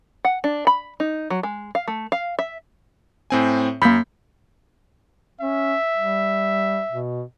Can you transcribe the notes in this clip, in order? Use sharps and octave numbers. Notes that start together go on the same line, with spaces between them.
F#5
D4
B5
D#4
F#3
G#3
F5
A3
F5
E5
A2 C4 G#5
F#2 A#3 B5 G6 B6
C#4 E5
G3
B2